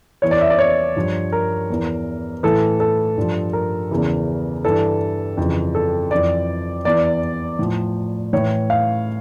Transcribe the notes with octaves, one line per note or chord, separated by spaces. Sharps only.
E2 E3 C#5
D5
E5
D5
C#5
G2 F3
A#4
E2 E3
A2 E3 A4
A4
G2 F3
A#4
E2 C#3 E3
G2 E3 A4
F2 C#3 E3
A4
F2 E3 D5
E2 E3 D5
A2 F3
A2 E3 C#5
F5